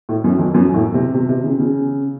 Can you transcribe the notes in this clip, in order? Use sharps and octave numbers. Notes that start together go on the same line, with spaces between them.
A2
F#2
F2
F#2
A2
C3
C3
C3
C#3
C#3